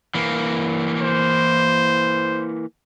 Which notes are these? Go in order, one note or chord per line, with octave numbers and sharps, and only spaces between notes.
E3 A#3
C5